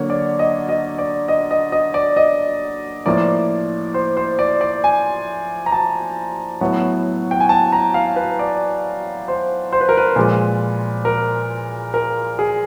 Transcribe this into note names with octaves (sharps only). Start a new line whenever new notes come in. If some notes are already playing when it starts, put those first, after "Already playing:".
Already playing: D3 F#3 A#3 C#5
D5
D#5
D#5
D5
D#5
D#5
D#5
D5
D#5
A2 F3 A#3 D5
C5
C5
D5
D5
G#5
A#5
A5
A2 F#3 B3
G5
G#5
A5
A#5
F5
B4
D5
C5
C5
B4
A#4
B4
A#2 F3 G#3
A#4
A#4
G#4